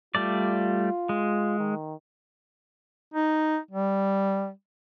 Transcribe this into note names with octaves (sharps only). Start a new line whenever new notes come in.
G3 A3 F4 D5
G#3
D#3
D#4
G3